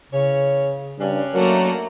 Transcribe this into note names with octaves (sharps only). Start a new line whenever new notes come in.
C#3 E3 C#4 C#5
G2 C#4 D4
F#3 A3 A#3 A#4 F#5